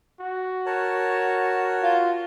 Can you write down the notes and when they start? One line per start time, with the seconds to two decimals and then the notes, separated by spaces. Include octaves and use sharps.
0.21 F#4
0.66 A#4 C#5 A5
1.83 F4